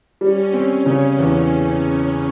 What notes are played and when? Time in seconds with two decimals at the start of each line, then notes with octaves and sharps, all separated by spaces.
0.21 G3 C#4
0.53 C4
0.86 C#3
1.18 E2